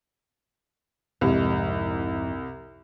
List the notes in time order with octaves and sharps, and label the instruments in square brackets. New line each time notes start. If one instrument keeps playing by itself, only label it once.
[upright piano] C2 [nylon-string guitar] F2 G#2 G4